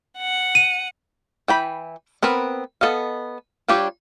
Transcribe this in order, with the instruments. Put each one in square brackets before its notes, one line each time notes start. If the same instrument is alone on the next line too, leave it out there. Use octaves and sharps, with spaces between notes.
[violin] F#5 C#7
[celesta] D#7
[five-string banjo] E3 G5 B5
B3 C4 A#4 B4
B3 A4 D#5 F5
G3 D4 F4 G4 C#5